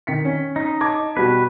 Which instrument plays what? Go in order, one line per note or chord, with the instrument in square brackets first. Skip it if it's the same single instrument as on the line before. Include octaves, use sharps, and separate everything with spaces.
[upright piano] D#3 B6 C#7
C#4
[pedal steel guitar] D#4
[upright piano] A5 D6 G#6
[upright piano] B2 G3 F#4 [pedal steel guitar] B4